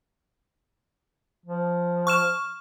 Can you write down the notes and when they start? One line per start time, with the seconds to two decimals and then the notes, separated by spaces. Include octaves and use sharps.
1.46 F3
2.07 C#6 F6 E7